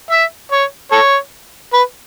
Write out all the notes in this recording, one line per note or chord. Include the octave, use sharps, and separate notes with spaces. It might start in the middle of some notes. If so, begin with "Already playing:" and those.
E5
C#5
A4 C#5
B4